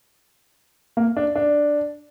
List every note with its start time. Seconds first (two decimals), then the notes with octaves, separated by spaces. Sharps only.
0.97 A#3
1.17 D4
1.36 D4